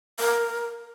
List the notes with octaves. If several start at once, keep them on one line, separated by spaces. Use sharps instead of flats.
A#4